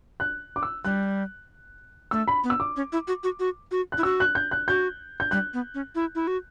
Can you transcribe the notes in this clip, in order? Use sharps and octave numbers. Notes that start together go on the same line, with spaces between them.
F#6
D6
E6
G3 F#6
A3 E6
B5
B3
E6
D6
C#4
E4
F#4
F#4
F#4
F#4
F#6
E4
F#4 E6
F#6
G6
F#6
F#4 G6
G6
G3 F#6
B3
C#4
E4
E4
F#4